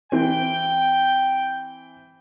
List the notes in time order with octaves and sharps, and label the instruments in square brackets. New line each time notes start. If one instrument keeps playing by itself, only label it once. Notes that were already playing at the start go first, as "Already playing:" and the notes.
[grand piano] E3 C4 [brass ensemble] G5